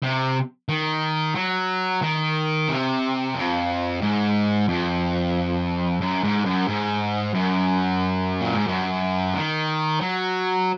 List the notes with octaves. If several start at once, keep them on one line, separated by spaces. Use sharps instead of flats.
C3
D#3
F#3
D#3
C3
F2
G#2
F2
F#2
G#2
F#2
G#2
F#2
A#2
G#2
F#2
D#3
F#3